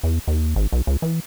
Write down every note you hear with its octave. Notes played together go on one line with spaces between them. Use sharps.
E2
D#2
G#1
B1
C#2
E3